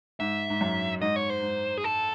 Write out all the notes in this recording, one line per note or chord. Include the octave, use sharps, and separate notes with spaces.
G#2 E5
G#2
F#2
G#2 D#5
C#5
C5
G#2
G#4
A4